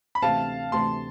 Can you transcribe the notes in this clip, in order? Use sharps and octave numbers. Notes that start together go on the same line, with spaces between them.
B5
D2 C3 E3 A3 C4 F5 A5
D2 C3 E3 A3 C4 A5 C6